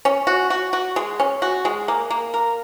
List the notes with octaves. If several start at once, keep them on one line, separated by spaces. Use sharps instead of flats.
C#4
F#4
F#4
F#4
G#3
C#4
F#4
G#3
A#3
A#3
A#4